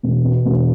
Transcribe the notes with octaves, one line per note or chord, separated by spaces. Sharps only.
E1
B2
E1